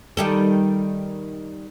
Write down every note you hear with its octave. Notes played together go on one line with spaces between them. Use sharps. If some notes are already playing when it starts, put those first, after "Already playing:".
D#3 G3 A4